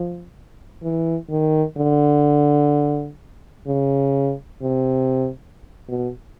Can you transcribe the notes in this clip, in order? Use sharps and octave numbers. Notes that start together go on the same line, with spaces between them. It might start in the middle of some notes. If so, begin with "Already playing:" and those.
Already playing: F3
E3
D#3
D3
C#3
C3
B2